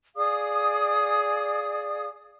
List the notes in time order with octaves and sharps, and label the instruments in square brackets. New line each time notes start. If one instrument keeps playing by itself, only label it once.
[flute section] G#4 D5 F5 [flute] D#6